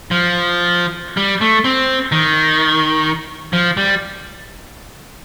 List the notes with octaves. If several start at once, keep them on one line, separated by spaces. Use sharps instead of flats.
F3
G3
A3
C4
D#3
F3
G3